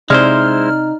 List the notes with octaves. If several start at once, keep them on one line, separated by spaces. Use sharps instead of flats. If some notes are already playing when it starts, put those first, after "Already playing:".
C3 G#3 D#4 E4 C5 D5 F6